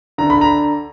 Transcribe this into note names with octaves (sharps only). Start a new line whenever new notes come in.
D3 A#5
B5
A#5